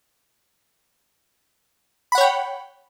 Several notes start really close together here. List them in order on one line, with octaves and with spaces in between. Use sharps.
B5 F#5 C#5 G5